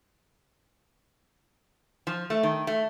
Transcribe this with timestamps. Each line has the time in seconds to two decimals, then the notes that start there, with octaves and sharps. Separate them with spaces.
2.07 F3
2.30 A3
2.43 D#3
2.67 A3